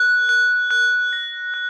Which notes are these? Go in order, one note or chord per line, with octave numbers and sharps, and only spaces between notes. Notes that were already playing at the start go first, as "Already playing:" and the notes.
Already playing: F#6
F#6
F#6
A#6
F#6